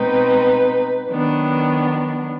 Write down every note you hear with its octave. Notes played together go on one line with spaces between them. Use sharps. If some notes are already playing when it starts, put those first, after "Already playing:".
Already playing: B2 G#3 C4 D#4 B4
D#3 F#3 B3 D4